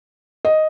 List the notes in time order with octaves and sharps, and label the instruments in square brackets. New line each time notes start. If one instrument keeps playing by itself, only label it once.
[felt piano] D#5